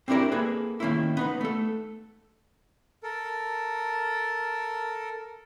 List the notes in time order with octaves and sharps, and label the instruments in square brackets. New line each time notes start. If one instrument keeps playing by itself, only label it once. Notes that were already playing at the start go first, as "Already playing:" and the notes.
[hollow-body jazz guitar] C4 D4 E4 G4 A#4
A#3 G#4 A4 B4
D#3 A#3 C#4 E4
B3 D#4 B4
A3 A4
[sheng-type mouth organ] A4 A#4